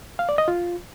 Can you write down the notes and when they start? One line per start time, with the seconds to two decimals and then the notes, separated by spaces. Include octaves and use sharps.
0.19 F5
0.29 D5
0.38 D#5
0.48 F4